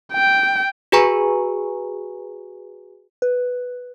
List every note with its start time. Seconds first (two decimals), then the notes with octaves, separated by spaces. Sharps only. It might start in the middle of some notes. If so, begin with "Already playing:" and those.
0.13 G5
0.92 F#4 G#4 B4 G#5 A#5 C#6
3.22 B4